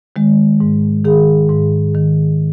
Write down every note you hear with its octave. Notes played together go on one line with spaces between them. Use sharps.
D#3 G#3
G#2
D#3 G#4
G#2
D#3